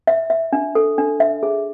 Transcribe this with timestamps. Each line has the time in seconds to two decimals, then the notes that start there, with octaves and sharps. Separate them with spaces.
0.07 E5
0.30 E5
0.53 D4
0.75 A4
0.98 D4
1.20 E5
1.43 G#4